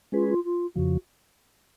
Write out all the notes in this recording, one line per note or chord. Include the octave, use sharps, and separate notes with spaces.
G#3 C#4 F4 G#4 B4
F4
F4
F2 C#3 F3 F#4